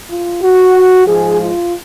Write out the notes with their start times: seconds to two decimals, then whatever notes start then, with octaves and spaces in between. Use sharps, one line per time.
0.11 F4
0.43 F#4
1.06 G#2 F3 G#3 G#4
1.38 F4